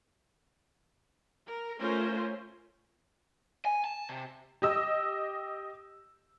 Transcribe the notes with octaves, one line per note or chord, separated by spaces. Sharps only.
A#4
A3 C#4 F4 A#4 C5
G#5
A5
C3
G4 D#5 E6